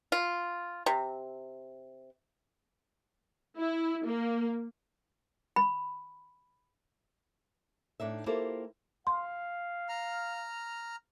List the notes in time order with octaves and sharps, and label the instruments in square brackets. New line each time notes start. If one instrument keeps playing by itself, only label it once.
[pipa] F4
C3
[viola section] E4
A#3
[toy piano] B5
[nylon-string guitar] A2 D4 D#4 E5
A#3 E4 F4 G4 A4 C5
[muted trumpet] F5 [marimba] C6
[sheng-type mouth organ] A#5 F6